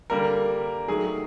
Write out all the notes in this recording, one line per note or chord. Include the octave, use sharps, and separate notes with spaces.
D3 G3 A#3 A#4
D#3 F#3 A3 G#4